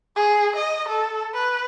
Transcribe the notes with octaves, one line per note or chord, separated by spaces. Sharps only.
G#4
D#5
A4
B4